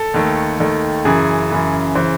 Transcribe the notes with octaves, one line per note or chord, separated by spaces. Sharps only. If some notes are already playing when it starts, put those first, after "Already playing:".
Already playing: A4
D#2 D#3 A3
D#2 D#3 A3
F#2 C#3 E3 G#4
F#2 C#3 E3
C#3 E3 C5